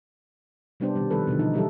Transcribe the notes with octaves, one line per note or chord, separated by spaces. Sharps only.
C3 G3 B3 D4 G4 C5
B2 D#3 G3
D#3 F3 G3 B3 A4 B4
B2 D3 E3 F3
D#4
E3 F#3 G3 E4 G4 A4